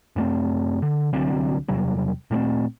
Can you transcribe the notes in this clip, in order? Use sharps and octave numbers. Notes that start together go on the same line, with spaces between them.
F#2 A3 C4
D3
C2 D3 F#3 C4
E2 C3 F#3 G3
A#2 A3 A#3 C4